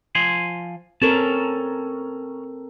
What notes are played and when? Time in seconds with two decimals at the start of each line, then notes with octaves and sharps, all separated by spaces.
0.15 F3 G#5 C6
1.02 C4 C#4 A4 A#4 C#5 A5